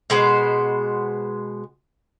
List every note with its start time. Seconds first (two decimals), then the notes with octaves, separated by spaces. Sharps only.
0.10 B2 G#3 B3 C5